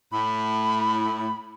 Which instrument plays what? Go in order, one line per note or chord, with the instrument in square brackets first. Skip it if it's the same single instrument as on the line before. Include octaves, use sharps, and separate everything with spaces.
[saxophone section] A2 [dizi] B5